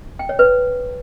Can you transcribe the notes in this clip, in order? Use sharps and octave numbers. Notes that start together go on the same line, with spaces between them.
G5
C#5
B4